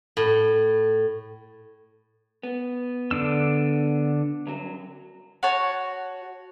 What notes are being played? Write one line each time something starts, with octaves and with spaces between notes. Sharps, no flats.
A2
B3
D3 D4 E6
G2 F#3
F#4 C#5 A5